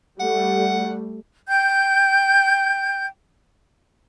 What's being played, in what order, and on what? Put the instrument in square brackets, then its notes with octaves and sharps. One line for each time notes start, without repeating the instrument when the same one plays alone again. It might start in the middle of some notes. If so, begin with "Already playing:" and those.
[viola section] G3 A3 [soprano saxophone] F#5
[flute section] G5 G6